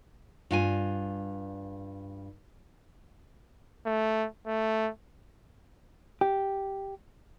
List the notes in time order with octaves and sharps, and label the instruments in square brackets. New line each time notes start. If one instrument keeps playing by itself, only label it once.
[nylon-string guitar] G2 F4 G#5
[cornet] A3
A3
[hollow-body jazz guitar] G4